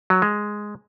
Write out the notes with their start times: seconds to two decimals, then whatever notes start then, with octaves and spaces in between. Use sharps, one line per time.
0.10 F#3
0.22 G#3